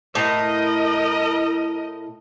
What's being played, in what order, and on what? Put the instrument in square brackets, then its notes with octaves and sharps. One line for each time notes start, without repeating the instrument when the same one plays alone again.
[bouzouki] A2 [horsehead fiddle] A#4 D#5